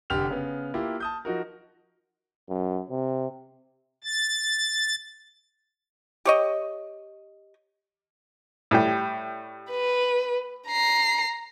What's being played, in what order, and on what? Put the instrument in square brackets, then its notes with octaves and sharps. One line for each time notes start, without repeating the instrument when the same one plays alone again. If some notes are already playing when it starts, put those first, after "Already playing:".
[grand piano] F1 D3 G4 F6 F7
C#3 B3
A#3 E4 F4 G4
A5 D#6 G6
F3 D#4 F#4 A#4
[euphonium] F#2
C3
[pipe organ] A6
[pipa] G4 C#5 D#5
[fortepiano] A2 G3 G4
[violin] B4
A#5 C7